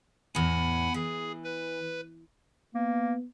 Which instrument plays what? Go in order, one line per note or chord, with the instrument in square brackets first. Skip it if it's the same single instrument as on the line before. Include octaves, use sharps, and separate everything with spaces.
[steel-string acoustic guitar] E2 A2 [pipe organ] F#5 G#5 B5
[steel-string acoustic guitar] E3 [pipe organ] G#4
[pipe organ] B4
[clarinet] A#3 [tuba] B3